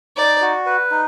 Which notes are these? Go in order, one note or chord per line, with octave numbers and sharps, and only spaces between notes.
D#4 D5
F#4
B4
D#4